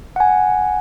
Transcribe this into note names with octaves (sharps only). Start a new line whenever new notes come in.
F#5 G#5